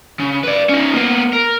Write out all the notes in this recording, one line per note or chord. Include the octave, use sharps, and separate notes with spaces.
C#3
B4 D5
C#4 D#4
A#3 B3
A#4